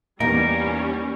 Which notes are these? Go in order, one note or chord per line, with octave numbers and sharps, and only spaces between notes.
E2 G3 A#3 C#4 D#4 A#4